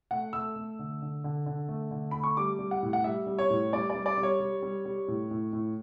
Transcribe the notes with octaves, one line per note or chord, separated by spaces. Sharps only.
A3 F#5
A3 E6
A3
D3
D3
D3
D3
A3
D3
A3 B5
C#6
G3 D6
G3
F#5
A2
F#5
G3 E5
G3
C#5
A2
G3 D5
G3 D5
D5
G3
C#5
G3
G3
G3
A2
A2
A2